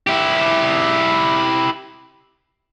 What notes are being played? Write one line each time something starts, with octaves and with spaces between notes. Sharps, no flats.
E4 G4